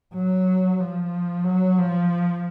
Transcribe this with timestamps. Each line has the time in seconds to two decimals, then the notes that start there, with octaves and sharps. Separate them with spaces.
0.14 F#3
0.80 F3
1.44 F#3
1.78 F3